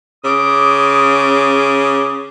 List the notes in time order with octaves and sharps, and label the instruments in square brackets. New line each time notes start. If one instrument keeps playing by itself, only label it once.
[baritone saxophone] C#3 [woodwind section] D6 D#6